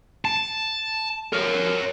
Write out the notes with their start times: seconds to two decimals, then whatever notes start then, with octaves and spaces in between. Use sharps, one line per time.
0.25 A5
1.33 A#4 C#5